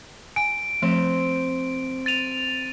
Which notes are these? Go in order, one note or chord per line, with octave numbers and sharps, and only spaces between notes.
G#5 D7
F3 A3 C4
A6 D#7 F7